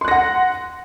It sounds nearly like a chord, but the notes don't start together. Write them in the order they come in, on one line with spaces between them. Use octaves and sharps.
C6 F#6 A#6 F#5